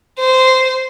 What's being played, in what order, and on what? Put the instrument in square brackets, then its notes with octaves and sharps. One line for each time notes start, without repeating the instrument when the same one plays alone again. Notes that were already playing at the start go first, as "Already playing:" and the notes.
[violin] C5